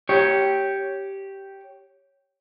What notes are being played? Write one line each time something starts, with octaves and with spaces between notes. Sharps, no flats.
G4 C#5